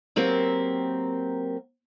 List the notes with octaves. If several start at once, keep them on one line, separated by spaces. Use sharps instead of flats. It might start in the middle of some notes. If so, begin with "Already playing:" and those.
F#3 A#3 C4 G4 A#4